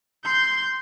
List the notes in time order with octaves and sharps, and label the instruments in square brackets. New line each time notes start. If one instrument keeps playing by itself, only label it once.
[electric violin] C6 G6